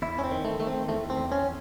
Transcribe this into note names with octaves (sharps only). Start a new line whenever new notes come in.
E2 E4
C#4
C4
D#3
A3
D#3 A3
C4
E2 A3
C4
E2
C#4